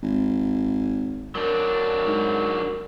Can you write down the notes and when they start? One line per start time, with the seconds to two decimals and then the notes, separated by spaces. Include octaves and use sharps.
0.03 G#1
1.35 F#3 D4 A#4
2.07 G#2